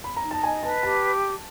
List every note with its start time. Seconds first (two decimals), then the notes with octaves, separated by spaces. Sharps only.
0.04 B5
0.16 A#5
0.24 D#4
0.31 A5
0.43 D#5 G#5
0.63 B4 A5
0.83 G4 A5